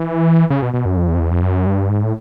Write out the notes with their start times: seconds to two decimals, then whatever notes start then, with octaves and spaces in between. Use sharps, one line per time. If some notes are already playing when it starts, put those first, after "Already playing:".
Already playing: E3
0.50 C#3
0.62 B2
0.74 B2
0.85 F#2
0.97 F2
1.08 E2
1.15 F2
1.19 E2
1.31 F2
1.43 F#2
1.66 G2
1.89 G#2
2.03 A2